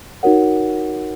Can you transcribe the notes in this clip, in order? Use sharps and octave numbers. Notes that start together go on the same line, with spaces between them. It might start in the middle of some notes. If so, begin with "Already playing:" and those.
D#4 F#4 A#4 C#5 F#5